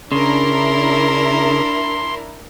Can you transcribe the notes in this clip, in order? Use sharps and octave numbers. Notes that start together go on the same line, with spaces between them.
C#3 D4 E4 A#4 C6